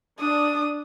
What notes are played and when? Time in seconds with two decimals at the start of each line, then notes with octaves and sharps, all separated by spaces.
0.20 D4 D#6